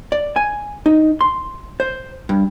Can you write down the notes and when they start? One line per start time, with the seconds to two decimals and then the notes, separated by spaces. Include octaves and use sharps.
0.12 D5
0.36 G#5
0.86 D#4
1.21 C6
1.80 C5
2.29 G2